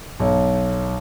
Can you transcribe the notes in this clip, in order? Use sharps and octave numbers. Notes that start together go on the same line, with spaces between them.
B1